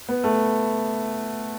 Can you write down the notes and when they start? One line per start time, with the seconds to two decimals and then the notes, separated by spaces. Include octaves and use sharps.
0.09 B3
0.24 A3